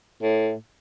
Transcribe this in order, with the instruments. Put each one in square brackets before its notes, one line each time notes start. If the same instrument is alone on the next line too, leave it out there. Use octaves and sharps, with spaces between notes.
[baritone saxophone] A2